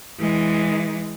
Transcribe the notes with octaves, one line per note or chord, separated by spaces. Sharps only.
E3 G#3